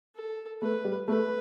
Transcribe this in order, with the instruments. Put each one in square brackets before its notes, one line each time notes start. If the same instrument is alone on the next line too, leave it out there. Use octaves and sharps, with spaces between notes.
[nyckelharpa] A4
[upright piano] A3 [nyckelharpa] B4
[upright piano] G3
[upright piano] A3 [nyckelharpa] B4